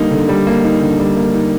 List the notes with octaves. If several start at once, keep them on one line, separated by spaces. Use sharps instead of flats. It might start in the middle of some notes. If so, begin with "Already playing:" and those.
Already playing: D3 G3 A#3 D#4
D3
G3
A#3
D#4
D3
G3
A#3
D#4